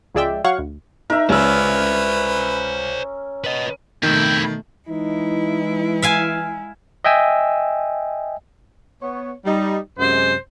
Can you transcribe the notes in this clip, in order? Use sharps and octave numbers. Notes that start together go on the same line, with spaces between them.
C#2 F3 G#3 D5 E5 G5
F#3 C#5 F5 F#5 C#6
D2
D#4 A#4 E5
C#2 C#4 B4 C5 D5 E6
B4 D#5
F2 B2 D#3 A3 E4 G5
E3 G#3 D#4 E4
E5 F5 G#5
D#5 E5 G5 G#5 E6
B3 C#5
G3 D#4
F#2 C3 G#3 C5